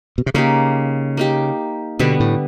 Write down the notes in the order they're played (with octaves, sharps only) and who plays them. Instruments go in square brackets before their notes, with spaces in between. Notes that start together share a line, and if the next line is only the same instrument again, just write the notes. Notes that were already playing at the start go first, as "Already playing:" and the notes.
[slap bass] B2
C3
[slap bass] C#3 [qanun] A#3 D#4 G4
[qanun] A#3 D#4 G4
[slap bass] B2 [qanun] D3 G3 B3
[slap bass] A2